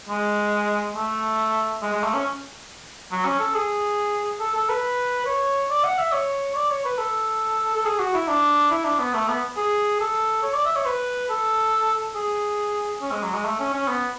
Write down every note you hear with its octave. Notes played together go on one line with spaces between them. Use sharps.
G#3
A3
G#3
G#3
A3
C#4
F#3
C#4
A4
G#4
A4
A4
B4
C#5
D5
F#5
E5
C#5
D5
C#5
B4
A4
A4
G#4
F#4
E4
D4
E4
D4
B3
A3
B3
G#4
A4
C#5
D5
E5
C#5
B4
A4
G#4
C#4
G#3
F#3
G#3
A3
C#4
C#4
B3